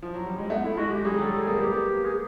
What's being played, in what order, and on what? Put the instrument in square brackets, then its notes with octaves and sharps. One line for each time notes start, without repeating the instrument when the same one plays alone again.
[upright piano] F3
F#3
G3
G#3
[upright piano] A3 [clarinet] B3
[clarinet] E4
[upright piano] G#3 [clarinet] F#4
[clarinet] G4
[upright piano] G3 [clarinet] G#4
[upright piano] F#3
G3
[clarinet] A4
G#4
[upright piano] A#3
[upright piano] B3 [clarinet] G4
[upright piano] A#3
[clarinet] G#4